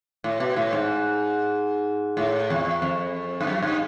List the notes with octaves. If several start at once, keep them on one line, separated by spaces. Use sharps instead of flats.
A2
B2
A2
G#2
A2
E2
F2
G2
F#2
G2